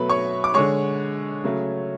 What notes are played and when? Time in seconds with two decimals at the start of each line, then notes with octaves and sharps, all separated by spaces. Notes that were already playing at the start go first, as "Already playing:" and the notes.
Already playing: B2 F#3 A3 B4 B5
0.09 C#5 C#6
0.44 D6
0.54 D3 G#3 C#5 C#6
1.44 C#3 F#3 A3